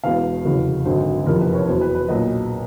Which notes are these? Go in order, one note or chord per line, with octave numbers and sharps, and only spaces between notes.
E1 E2 B2 F5
F1 E2 C#3 F#3
G#1 F#2 D3 F#3 C5
F#1 F2 C3 F3 A#4
B4
C#5
E2 B2 F#3 C5
B4
B4
B1 A#2 F#3 D#5